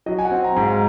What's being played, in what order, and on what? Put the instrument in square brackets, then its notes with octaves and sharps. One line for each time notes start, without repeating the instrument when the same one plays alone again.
[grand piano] F#3 D#5
G#5
F#5
C4
A#5
G#2
F5